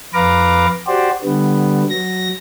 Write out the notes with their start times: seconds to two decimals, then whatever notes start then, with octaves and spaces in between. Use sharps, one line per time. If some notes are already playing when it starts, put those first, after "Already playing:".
0.14 F2 B4 F5 A#5 D6
0.87 F#4 G4 C5 D5
1.24 D3 G3 B3
1.90 F#3 A#6